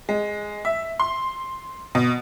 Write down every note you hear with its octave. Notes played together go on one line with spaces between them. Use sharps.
G#3
E5
C6
B2